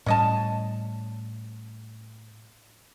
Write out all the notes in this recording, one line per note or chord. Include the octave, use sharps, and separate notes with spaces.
A2 G3 C#4 D#5 A5